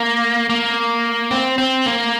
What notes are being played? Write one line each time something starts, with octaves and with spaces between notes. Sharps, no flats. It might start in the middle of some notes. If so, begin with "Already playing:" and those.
Already playing: A#3
A#3
C4
C4
A#3